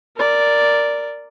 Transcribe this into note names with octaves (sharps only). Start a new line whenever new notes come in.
A#4 D5